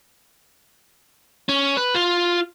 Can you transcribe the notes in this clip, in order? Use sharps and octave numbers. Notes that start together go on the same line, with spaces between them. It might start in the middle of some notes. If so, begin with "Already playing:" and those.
C#4
B4
F4